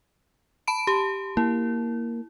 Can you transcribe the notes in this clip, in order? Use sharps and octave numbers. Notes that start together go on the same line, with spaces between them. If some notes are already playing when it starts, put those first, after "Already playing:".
A5 B5 D7
G4
A#3 E4